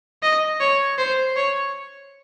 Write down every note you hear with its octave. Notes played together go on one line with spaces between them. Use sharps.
D#5
C#5
C5
C#5